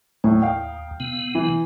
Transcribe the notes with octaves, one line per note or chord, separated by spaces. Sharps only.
D#2 A2
F5 G5
C3 B3
E3